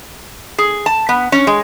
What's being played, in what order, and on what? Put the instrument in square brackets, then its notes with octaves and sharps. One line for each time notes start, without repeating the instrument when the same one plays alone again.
[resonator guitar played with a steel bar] G#4
A5
B3
C#4
G#3